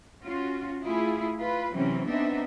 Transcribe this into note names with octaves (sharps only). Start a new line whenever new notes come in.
C#4 F4 F#4
A3 E4 F4 G#4
F4 B4
C3 E3 F#3 C4 C#4
B3 C4 D4 D#4 E5